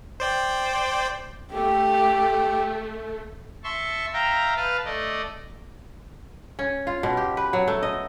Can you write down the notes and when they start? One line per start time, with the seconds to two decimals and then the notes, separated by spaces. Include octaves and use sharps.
0.20 C5 D5 G5
1.53 A3 G4
3.64 E5 A5 C6 C#6
4.13 E5 F5 G5 A#5
4.56 B4 F5 A5
4.85 A3 D5 D#5
6.59 C#4
6.87 F4
7.03 B2
7.17 G4
7.37 B4
7.53 F#3
7.68 A3
7.83 D#5